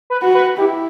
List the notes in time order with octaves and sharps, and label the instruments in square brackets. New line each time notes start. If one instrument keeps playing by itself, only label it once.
[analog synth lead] B4
[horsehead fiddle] F#4
[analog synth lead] B4
[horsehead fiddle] E4 [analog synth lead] G4